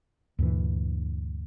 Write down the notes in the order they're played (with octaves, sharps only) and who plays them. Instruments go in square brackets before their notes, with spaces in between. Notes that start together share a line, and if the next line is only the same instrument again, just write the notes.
[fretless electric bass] D2 G2 A#2 E3